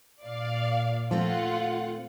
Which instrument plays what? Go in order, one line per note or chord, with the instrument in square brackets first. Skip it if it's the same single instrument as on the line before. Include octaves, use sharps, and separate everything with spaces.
[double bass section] A#2 [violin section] D5 F5
[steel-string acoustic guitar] D#2 A3 C4 [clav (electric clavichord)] F3 [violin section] F4 F#5